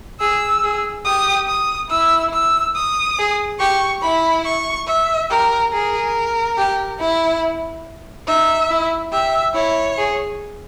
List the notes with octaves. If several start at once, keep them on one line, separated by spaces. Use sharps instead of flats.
G#4 E6
G#4
G4 D#6
D#6
E4 E6
E6
D#6
G#4
G4 C#6
E4 B5
C#6
E5
G4 A#4
G#4 A#4
G4
E4
D#4 E5
E4
G4 E5
E4 C#5
G#4